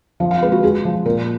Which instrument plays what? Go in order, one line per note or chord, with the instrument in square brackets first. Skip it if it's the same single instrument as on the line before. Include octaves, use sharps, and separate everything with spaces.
[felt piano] F3
F5
G#3 B4
F#4
G#3 G#4
F3
A#2 A#4